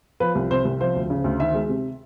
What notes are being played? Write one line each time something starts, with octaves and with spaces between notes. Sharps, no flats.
F3 B4
C2
C3 C5
C2
F3 C5
D2
C#3
D2
D#3 E5
G#3
C3